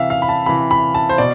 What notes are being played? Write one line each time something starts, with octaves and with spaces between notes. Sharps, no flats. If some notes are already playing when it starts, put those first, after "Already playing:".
Already playing: C3 E3 E5 F5
F5
B5
A5
C3 E3 B5
B5
A5
C5
B2 D5